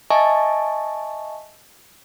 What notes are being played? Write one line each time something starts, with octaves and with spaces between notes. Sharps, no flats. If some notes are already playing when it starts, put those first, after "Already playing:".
D#5 E5 G#5 A5 C#6